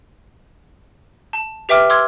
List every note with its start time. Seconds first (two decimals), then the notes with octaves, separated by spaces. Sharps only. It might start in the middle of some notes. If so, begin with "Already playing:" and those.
1.33 A5
1.69 G4 B4 E5 G5 D6 F6
1.90 C6 D6 E6 F6 G#6